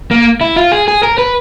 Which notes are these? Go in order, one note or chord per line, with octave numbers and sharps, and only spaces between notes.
A#3
E4
F4
G#4
G#4
A#4
B4